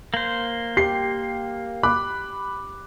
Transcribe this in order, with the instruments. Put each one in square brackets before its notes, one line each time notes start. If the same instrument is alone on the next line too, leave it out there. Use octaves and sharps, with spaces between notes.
[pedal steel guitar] A#3 C5
[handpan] G4 [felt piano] C7
[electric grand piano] B5 F#6 [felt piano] D6